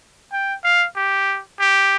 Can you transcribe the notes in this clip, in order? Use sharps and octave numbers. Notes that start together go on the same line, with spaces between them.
G5
F5
G4
G4